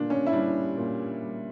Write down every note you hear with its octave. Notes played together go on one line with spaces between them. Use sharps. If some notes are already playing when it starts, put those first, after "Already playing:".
Already playing: A#2 G3 D4
C#4
E4
G3 D4
A#2
G3